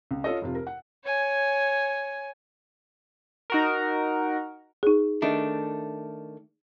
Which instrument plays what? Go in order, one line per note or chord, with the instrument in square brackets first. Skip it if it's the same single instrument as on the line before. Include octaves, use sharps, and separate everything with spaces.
[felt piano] C#2
C#4 F4 A4 C#5 D#5
F1 C3 F4
A#4
F#5
[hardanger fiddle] C#5 G#5
[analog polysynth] D#4 F#4 A#4
[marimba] D#4 G#4
[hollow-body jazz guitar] D#3 A3 D4